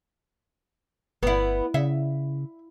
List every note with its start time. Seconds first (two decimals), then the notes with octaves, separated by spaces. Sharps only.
1.23 G1 B3 E4
1.74 C#3 E5